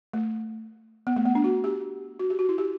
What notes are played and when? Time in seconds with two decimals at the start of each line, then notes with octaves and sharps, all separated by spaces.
0.13 A3
1.07 B3
1.16 A3
1.25 B3
1.35 D4
1.44 F#4
1.64 G4
2.19 F#4
2.30 G4
2.39 F#4
2.49 E4
2.58 G4